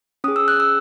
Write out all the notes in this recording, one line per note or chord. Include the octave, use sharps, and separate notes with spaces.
C#4 G#4 D#6
E6
F#6
E6